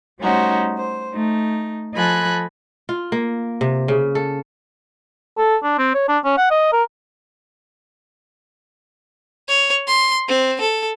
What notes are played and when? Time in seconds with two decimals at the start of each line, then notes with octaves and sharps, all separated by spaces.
0.20 G3 A3 C#4 D#4 F#4 C5
0.74 C5
1.13 A3 D#4
1.94 F3 A4 D#5 G#5 B5 F#6
2.89 F4
3.12 A#3
3.61 C3
3.88 C#3
4.15 A4
5.38 A4
5.63 D4
5.78 C4
5.94 C#5
6.08 D4
6.24 C#4
6.38 F#5
6.50 D#5
6.72 A#4
9.48 C#5
9.88 C6
10.28 C4
10.61 A4